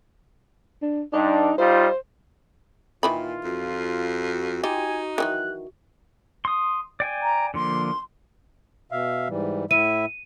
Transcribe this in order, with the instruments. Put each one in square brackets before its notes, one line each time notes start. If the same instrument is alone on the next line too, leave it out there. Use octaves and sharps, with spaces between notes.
[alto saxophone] D4
[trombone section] G2 D4 [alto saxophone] D#4
[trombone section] G3 D#4 F4 [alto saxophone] C5
[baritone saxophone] A#2 [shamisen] D#3 E3 B5 [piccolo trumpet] F4
[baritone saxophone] F2 [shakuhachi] F#4
[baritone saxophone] D#4 [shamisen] F4 G4 [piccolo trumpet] G#5
[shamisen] D#3 E3 F#3 [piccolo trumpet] F#6
[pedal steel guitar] C6 D#6
D5 G5 G#5
[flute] A#5
[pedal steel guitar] D3 F3 A#3 [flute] C6
[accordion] B2 E5 F5
G#2 E3 G3
[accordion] A2 E4 E5 [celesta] D#7